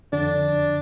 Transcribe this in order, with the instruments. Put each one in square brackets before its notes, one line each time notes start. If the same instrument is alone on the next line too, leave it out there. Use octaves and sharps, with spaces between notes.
[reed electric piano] F2 D3 [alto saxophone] D4